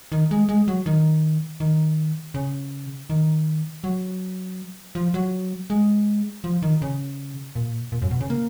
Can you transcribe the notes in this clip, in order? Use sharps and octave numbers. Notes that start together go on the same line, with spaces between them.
D#3
G#3
G#3
F#3
D#3
D#3
C#3
D#3
F#3
F3
F#3
G#3
F3
D#3
C#3
A#2
A#2
F#2
B2
C#3
A#3